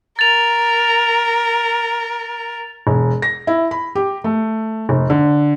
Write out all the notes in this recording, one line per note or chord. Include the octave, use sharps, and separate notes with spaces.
A#4 A6 F7
E1
A#6
E4
B5
G4
A3
F1
D3